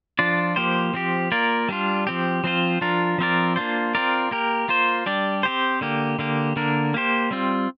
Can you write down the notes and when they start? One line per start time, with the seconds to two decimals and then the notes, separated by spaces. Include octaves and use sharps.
0.19 F3 D4 F4 D5
0.56 F3 A#3 G4 C5
0.94 F3 C4 G4
1.32 A#3 F4 A#4 D5
1.69 G3 D4 F4
2.07 F3 C4 G4
2.44 F3 C4 F4 C5
2.81 F3 D4 F4 A#4
3.18 F3 C4 F4 A#4 D5
3.56 A#3 D4 F4 C5
3.95 C4 F4 A#4 D5
4.31 A#3 G4 A#4
4.69 A#3 F4 C5
5.06 G3 D4 G4 D5
5.43 C4 G4 C5
5.81 D3 A#3 G4
6.19 D3 A#3 G4
6.56 D3 A#3 D4 A#4
6.94 A#3 G4 C5
7.31 G3 C4 F4